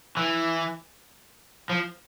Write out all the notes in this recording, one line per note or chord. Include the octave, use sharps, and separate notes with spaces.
E3
F3